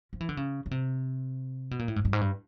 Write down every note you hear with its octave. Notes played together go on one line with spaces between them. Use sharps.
F3
E3
D3
C#3
C#3
C3
B2
A#2
A2
G#2
G2
G#2
G2